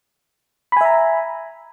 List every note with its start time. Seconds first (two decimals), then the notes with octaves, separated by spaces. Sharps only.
0.72 B5
0.77 G#5
0.81 E5
0.85 A#5